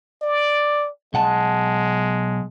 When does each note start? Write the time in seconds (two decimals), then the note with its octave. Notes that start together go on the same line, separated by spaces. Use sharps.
0.22 D5
1.14 B1 G#3 F#5 A5